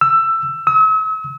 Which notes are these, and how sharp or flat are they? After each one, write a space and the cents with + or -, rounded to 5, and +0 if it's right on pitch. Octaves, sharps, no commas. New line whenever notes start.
E6 +15
E6 -45